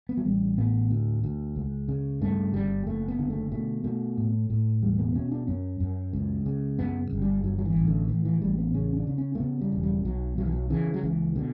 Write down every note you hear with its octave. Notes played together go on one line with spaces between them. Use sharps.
B3
F#3
A1 G3
A2 B3
D2
D2
C#2
C#3
G2 A3
G1 G3
F#1 A3
B3
D3
A3
B2 A3
B2 A3
A2
A2
E1 G3
B3
B2 C#4
D4
F#2 C#4
F#2
C#2
C#3
F#2 B3
G1
G3
G2 F#3
F#3
E3
A1
D3
A2 E3
E3
A1 G3
B3
C#3 C#4
D4
C#3
C#4
A3
C#3 B3
G3
E1
G3
B1 F#3
B1 F#3
E3
F#3
C#3 E3
F#3
C#2 E3
B2 D3